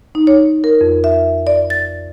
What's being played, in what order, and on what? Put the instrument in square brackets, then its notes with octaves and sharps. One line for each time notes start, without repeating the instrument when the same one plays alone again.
[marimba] D#4
C#5
A#4
F2
E5
D5
A6